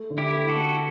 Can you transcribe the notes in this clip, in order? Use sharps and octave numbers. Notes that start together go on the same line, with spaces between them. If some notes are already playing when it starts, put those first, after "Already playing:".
Already playing: A3
D3
E4 G4
A3
F#4 A4
A3